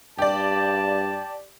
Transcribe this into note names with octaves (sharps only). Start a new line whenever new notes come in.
G2 G4 D5 A5